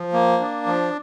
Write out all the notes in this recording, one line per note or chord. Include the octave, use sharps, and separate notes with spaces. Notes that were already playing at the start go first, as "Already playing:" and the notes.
Already playing: F3
A#3
D4
F3